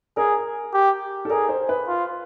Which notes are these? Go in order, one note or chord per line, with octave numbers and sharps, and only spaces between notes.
G#4 A#4
G4
A4
G#4 A#4
C5
B4
F4